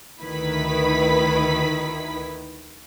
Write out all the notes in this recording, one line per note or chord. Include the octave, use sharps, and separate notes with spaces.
D2 D#3 E4 B4 B5 B6